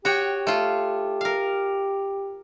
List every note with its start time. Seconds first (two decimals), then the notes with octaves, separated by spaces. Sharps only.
0.05 F#4 G4 C#5 G5
0.47 A3 F4
1.21 A#4 F5